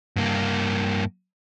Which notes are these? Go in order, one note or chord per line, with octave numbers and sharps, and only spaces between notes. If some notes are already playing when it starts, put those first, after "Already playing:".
G2 A#3